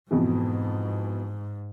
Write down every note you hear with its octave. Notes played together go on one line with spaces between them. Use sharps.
F2 G#2 B2 E3